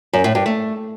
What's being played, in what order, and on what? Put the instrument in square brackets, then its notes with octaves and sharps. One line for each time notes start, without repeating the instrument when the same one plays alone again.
[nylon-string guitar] F#2
A2
G2
A3